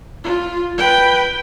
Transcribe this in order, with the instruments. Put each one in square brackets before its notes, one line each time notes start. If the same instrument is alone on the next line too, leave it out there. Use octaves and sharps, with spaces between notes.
[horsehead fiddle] F4
B4 G5